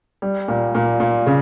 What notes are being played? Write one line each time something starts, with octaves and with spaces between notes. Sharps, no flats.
G3
A#2
A#2
A#2
C#3